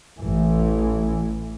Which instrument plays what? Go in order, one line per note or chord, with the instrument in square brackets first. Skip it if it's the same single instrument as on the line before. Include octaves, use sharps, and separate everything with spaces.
[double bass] A1 E3